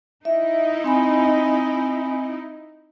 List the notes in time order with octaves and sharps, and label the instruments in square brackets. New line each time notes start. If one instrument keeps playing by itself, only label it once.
[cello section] D#4 E4 [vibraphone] E5
[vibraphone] C4 G#5 B5